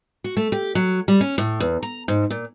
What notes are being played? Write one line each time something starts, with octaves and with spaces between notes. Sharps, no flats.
F#4
A3
G4
F#3
G3
C#4
A2
E2
A#5
G#2
A#2